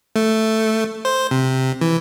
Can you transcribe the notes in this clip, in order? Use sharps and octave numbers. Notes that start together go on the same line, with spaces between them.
A3
C5
C3
E3